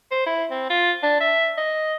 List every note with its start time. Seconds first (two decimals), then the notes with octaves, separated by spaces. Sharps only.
0.11 C5
0.26 E4
0.51 C4
0.70 F4
1.03 D4
1.20 E5
1.58 D#5